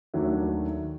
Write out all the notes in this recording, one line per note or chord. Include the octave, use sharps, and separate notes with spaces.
D#2 D#3 F#3 A3 D4